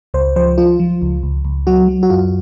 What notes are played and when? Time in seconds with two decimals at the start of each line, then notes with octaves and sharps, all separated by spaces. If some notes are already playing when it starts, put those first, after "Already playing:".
0.14 C#2 C5
0.36 F3 C5
0.58 F3 F4
0.80 F3
1.02 C#2
1.23 C#2
1.45 C#2
1.67 F#3 F#4
1.88 F#3
2.03 F#4
2.10 F#2 F4